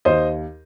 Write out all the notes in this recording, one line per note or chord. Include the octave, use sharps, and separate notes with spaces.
D#2 C5 D#5